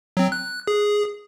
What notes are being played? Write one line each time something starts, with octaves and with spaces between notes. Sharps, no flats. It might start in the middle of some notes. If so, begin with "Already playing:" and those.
F#3 C4
F#6
G#4